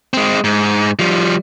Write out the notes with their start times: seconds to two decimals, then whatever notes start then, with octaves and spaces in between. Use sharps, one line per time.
0.14 G#3 C4
0.44 G#2
0.99 F3 G3